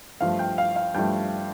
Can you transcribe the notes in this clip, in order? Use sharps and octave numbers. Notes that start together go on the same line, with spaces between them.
G2 F3 A3 F5
G5
F5
F5
G2 F3 A3 G5